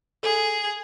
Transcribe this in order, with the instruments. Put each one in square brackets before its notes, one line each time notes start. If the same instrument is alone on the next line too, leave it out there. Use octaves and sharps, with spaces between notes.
[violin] G#4 [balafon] A4